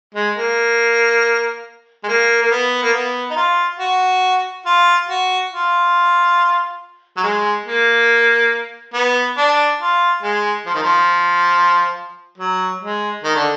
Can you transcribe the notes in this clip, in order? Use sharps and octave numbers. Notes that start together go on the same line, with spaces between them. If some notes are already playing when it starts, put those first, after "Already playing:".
G#3
A#3
G#3
A#3
A#3
B3
A#3
B3
D#4
F4
F#4
F4
F#4
F4
F#3
G#3
A#3
B3
D4
F4
G#3
F3
D#3
F3
F#3
G#3
D#3
D3